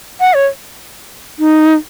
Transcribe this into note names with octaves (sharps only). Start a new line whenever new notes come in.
F#5
C#5
D#4